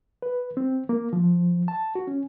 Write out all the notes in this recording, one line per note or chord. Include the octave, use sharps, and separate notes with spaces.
B4
C4
A#3
F3
A5
F#4
C#4